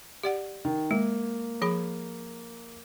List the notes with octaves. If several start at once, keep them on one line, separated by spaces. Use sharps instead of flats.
G4 D5 F#5
D#3
G#3 A#3
F3 G#4 B5